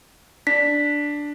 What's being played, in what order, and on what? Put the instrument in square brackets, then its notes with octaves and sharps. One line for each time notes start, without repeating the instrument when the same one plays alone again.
[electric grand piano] D4 [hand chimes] B6